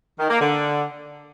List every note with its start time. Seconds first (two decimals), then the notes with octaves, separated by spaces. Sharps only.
0.20 D#3
0.30 A#3
0.41 D3